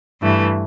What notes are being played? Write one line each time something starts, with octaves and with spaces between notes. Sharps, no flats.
G2 E3 A3